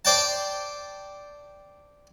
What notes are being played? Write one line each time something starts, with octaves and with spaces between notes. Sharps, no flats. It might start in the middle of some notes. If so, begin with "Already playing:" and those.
C5 D5 G5 A5